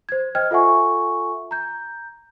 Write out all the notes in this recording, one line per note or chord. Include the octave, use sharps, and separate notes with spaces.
C5 G#6
C5 D#5 G5 F6 G#6
F4 A4 E5 F#5 G#5 C#6
A#5 G6